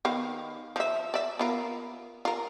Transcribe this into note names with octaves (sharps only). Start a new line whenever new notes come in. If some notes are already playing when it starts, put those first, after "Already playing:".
D#3 B3 F5
F3 E5
D5 E5
B3 F4 A#4
F4 A#4